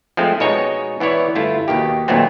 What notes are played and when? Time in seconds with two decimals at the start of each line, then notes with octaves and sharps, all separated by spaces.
0.17 F3 G#3 A3 C4 C5
0.40 B2 G#3 D#4 F#4 C#5 G#5
1.00 E3 B3 E4 C#5 D5
1.35 G1 A3 E4 F4
1.68 D#2 B2 D#3 G4
2.08 D#2 A#2 F#3 A3 B3 C4